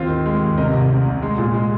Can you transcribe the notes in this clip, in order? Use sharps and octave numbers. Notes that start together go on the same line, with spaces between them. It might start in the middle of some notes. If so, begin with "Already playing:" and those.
Already playing: D#2 C4 F4
D#3
G#3
D#2
C3 A#4 D#5
C2
C3
C3
G#3
A#2
G#3